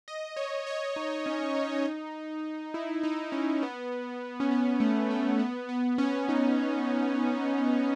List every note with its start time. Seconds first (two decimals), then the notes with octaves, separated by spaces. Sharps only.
0.08 D#5
0.36 C#5
0.67 C#5
0.96 D#4
1.26 C#4
1.55 D#4
2.74 E4
3.03 D#4
3.32 C#4
3.63 B3
4.40 C#4
4.51 B3
4.80 A3
5.10 A3
5.39 B3
5.69 B3
5.98 C#4
6.29 D#4